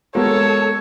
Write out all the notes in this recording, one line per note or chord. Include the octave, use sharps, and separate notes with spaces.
G#3 A#3 B3 F#4 A4 A#4 C#5